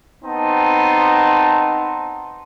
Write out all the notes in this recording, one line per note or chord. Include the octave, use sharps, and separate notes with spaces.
B3 C4 D#4 A5